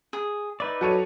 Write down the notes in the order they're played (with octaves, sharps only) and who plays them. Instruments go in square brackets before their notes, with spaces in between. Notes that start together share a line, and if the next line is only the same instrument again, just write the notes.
[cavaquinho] G#4
[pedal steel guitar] D#4 B4 D5 [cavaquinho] E5
[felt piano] F#3 C#7 D#7 [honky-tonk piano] F#4 A4 C#5